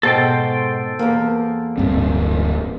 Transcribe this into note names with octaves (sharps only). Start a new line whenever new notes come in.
G#2 B2 G#3 A4 C5 G5
E2 A#3
D1 G2 C4